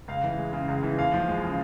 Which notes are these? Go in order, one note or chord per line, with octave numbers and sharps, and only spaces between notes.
C#2 F5
E3
G#3
C#3
C#2
E3
D#2 F5
F3
G#3
C#3